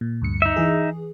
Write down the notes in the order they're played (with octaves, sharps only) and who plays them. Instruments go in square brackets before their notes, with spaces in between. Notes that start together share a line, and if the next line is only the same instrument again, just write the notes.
[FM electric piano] A#2
D2 G2 C#7
[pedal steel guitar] D#4 E5
[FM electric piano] E3 G#4